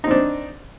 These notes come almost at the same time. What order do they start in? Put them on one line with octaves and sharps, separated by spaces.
D#4 C4 D4